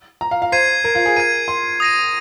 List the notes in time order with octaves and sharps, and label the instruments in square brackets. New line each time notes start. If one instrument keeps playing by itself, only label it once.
[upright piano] A#5
F5
F5
[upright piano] C5 [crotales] G#6 C7 D#7
[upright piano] A#4
F4
G#4
[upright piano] A#4 [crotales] G#6 D#7
[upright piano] C6
[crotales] D#6 A#6 D#7